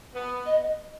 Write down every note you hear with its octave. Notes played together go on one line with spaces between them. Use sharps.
B3
D#5